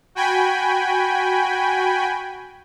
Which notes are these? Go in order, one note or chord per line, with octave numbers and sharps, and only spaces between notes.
F#4 G5 G#5 B5